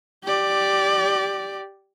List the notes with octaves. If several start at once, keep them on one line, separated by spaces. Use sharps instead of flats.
G4 D5